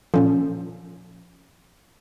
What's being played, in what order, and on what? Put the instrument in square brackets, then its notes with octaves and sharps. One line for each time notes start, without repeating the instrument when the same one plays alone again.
[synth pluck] A#2 C#4 A4 [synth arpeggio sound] F3